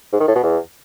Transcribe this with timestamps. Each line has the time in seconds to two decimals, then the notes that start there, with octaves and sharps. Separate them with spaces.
0.13 G#2
0.20 D#3
0.28 A2
0.35 B2
0.43 E2